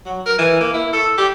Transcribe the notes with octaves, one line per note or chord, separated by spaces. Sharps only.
F#3
A#4
E3
A#3
E4
A4
G4